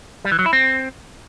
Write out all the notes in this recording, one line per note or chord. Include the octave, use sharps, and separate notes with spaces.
G3
E3
F#3
E4
C4